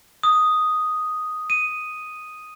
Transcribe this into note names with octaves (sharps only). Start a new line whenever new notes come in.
D#6
D#7